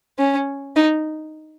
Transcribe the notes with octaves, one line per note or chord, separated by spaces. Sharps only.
C#4
D#4